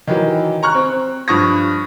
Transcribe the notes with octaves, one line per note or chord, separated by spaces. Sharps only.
D#3 E3 F#3
A#5 C#6 F6 F#6
C4
G2 F3 C#6 D#6 A#6